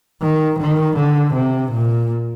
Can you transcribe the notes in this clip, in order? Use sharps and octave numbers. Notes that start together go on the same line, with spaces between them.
D#3
D#3
D3
C3
A#2